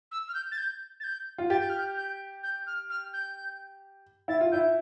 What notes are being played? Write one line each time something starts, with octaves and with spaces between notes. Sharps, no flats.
E6
F6
G6
A6
G6
A6
G6
F4
G4 A6
G6
F6
G6
G6
G6
F6
F6
G6
E4 A6
F4
E4 G6